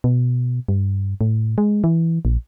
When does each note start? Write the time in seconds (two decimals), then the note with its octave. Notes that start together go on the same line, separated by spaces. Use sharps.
0.04 B2
0.68 G2
1.21 A2
1.58 G#3
1.84 E3
2.25 A#1